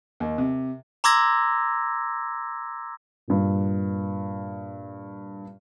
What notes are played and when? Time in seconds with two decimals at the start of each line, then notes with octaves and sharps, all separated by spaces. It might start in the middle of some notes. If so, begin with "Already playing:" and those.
0.20 D#2
0.38 C3
1.04 A#5 C6 D6 E6 G#6 A#6
3.28 G2 A#2